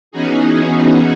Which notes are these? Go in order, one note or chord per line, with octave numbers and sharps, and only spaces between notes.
E3 B3 C#4 D#4 F#4 G#4